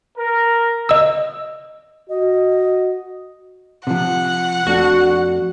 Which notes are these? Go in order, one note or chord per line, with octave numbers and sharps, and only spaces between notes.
A#4
D#5 E6
F#4 D#5
C3 F3 F#5
F2 A3 D4 F#4